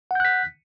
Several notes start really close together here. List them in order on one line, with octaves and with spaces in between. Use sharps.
F#5 G6 F#6 B6